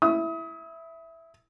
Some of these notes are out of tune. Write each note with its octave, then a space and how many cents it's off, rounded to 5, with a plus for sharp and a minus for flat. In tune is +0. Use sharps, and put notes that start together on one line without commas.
E4 +0 D#6 +35